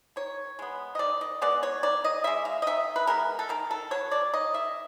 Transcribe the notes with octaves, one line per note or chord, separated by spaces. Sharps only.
D#3 C#5
G#3 B3
D#5
D#3 D5
D#5
G#3 B3 D5
C#5
D#3 D5
D#5
G#3 B3 E5
F5
D#5
D#3 E5
B4
G#3 B3 A#4
A4
D#3 A#4
A4
F#3 B3 C#5
D5
D#3 D#5
E5